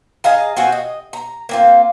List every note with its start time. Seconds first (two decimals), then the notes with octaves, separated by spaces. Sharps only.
0.24 G#4 D#5 F5 A#5
0.57 C4 F4 F#4 G#4
0.72 D#5
1.13 A#5
1.49 A#3 C4 F4